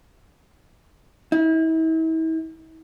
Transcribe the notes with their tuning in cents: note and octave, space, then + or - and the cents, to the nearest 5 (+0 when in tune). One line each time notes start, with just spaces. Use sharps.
E4 -40